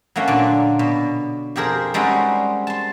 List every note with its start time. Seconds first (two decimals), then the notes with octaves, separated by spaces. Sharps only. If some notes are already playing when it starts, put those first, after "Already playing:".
0.16 F#3 A3 A#3 C#4
0.28 A#2 D3 D4
0.79 B2
1.56 F2 G4 G#4 A#4 C5
1.94 G3 G#3 C4 C#4 D#4 F#4
2.67 A5 C6